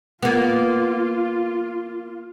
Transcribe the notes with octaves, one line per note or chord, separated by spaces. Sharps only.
A#3 B3 F4